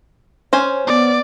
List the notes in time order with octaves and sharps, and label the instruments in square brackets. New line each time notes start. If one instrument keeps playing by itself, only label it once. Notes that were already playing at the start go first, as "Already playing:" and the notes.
[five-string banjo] C#4 C5 G#5 [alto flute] C#5
[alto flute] B3 [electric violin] D5